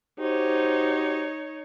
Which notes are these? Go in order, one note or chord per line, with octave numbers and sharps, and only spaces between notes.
D#4 F#4 G4 C5 C#5